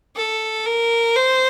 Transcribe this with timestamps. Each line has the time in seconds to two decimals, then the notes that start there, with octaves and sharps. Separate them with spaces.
0.16 A4
0.66 A#4
1.16 C5